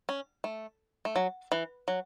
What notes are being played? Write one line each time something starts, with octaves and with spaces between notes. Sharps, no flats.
C#4
A3
A3
F#3
E3
F#3